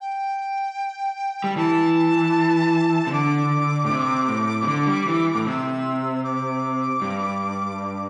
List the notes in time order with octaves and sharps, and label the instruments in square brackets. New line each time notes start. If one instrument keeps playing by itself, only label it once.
[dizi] G5
[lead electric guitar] G3
[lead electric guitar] E3 [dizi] A5
[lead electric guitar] C3
[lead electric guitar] D3 [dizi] D6
[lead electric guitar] A2
C3
A2
C3
D3
G3
E3
A2
[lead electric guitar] C3 [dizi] E6
[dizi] D6
[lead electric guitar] G2